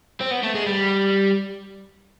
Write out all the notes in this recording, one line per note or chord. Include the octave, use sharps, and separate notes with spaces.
C4
B3
A3
G#3
G3